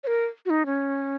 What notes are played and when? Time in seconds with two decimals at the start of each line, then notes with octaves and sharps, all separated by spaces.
0.04 C#5
0.07 A#4
0.46 F#4
0.50 D#4
0.66 C#4